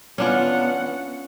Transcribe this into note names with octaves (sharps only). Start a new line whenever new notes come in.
B3 C#4 D4 F4 F#5